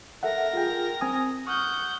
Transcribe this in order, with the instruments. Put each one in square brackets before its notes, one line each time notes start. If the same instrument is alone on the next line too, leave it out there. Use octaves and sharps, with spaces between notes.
[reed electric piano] A4 E5 F#5 [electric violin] A#4 A#6
[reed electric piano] F4 G#4 G5
C4 G#5 D#6
[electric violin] F#5 G6 [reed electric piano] C#6 D#6 F6